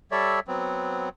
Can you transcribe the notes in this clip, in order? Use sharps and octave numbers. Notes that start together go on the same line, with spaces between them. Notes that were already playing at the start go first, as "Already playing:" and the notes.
G3 A4 C#5 D5 E5
F#3 B3 C4